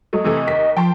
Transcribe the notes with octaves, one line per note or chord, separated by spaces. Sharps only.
F#3 A3 D#5
C3 E3 A3
D#2 B6
F3 G5 A5 C6